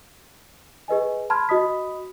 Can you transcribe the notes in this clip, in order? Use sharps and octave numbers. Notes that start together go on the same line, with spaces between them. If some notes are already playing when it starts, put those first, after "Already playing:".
G#4 B4 D#5 G#5
A5 B5 C6 F6 G#6
F#4 D#5 B5 D#6 B6